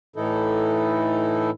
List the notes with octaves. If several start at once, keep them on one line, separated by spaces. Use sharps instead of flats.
A2 E3 D#4 E4 A4